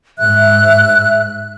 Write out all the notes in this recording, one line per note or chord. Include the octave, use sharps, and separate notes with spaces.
G#2 E5 F#6